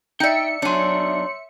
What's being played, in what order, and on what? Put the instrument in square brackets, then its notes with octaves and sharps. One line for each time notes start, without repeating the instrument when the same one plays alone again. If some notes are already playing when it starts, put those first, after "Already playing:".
[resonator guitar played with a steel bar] D#4 D5 [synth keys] E5 C#7 [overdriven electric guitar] G5
[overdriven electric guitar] B1 F#3 [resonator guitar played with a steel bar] D4 G#5 [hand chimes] C#5 C6